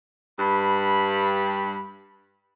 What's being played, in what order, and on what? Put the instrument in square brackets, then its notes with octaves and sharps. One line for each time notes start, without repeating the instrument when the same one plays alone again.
[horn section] G2 B5